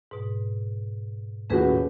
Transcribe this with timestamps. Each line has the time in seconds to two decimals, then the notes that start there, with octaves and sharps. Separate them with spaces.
0.11 G#2 B2
1.50 D#1 A2 C#4 F#4 G#4 B4